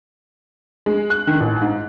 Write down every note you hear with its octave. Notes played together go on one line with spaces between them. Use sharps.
G#3
F#6
D#3
A1
G#2